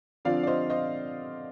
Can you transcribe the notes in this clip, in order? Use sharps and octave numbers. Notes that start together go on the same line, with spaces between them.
D3 F3 C4 F4 D5 F5
D5
C5 D#5
C5 D#5